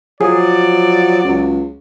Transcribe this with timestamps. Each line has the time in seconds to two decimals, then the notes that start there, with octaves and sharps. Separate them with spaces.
0.21 F3 F#3 G#4 D5
1.24 C#2